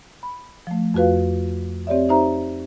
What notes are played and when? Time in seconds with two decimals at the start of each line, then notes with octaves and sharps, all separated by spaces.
0.23 B5
0.67 F3 A3
0.94 F2 F4 F#4 B4 F5
1.87 C4 G4 C#5 D5 E5
2.09 D#4 G4 C5 E5 A#5